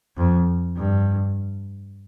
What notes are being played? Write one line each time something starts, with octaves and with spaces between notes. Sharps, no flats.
F2
G2